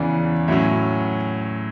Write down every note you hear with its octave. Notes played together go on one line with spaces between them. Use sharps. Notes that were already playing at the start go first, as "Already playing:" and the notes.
Already playing: E2 C#3 E3 D5
A2 F#3 C#4 E5